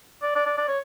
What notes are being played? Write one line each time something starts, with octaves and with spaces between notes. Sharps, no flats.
D5
D5
D5
D5
C#5